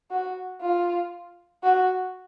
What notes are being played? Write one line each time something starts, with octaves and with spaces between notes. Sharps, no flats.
F#4
F4
F#4